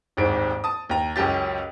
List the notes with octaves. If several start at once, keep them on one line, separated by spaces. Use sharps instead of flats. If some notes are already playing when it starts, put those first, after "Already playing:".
D#1 G#1 G#2 D7
A5 D#6
D#2 A#5
C#2 F#2 C#4 G4 A6